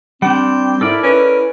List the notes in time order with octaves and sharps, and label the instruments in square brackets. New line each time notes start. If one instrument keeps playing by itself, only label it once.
[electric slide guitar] G3 D4 [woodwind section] C4 [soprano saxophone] G5
[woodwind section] G#2 [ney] E4 [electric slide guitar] A4 A#4 D5
[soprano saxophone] C#4 [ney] E4 [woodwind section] B4